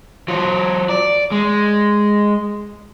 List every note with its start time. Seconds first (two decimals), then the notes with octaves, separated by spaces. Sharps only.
0.28 F#3 F4
0.89 D5
1.31 G#3